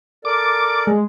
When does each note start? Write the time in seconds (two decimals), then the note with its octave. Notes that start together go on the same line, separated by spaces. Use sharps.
0.25 A4 A#4 D5 D6
0.87 G#3